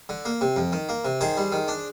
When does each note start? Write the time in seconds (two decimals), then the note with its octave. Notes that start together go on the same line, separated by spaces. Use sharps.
0.09 D3
0.25 A#3
0.41 C3
0.56 F2
0.72 D#3
0.89 A#3
1.05 C3
1.21 D#3 G#4 C5
1.37 G3
1.52 D#3
1.68 D4